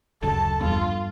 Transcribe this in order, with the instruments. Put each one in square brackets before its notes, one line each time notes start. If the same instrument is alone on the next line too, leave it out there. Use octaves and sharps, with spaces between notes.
[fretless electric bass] D1 F#2 C#3 [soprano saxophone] A4 [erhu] A5
[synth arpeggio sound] A#1 E2 [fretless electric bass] G2 [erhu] F4